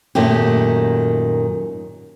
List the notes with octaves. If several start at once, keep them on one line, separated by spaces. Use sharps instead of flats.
F#2 A#2 D#3 A3 G4